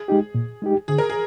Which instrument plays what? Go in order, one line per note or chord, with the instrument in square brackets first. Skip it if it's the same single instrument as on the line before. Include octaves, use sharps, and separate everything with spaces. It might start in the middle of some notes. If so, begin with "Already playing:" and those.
Already playing: [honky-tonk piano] G#4
[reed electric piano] G#3 D#4 G4
A#2
G#3 D#4 G4
[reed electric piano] D3 [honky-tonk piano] G#4
[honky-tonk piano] A#4
G#4